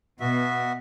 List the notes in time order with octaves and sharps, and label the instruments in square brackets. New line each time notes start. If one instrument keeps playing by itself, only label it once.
[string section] B2 [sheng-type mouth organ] B3 F#4 E5